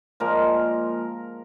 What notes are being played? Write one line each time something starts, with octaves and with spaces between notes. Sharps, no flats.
A#2 F3 G#3 A#4